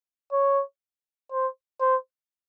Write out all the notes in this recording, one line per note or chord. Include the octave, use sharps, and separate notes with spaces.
C#5
C5
C5